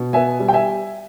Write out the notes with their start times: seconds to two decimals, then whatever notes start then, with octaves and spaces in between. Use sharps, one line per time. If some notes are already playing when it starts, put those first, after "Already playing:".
Already playing: B2
0.13 B3 E5 G#5
0.40 G3
0.49 G5
0.53 E5 G#5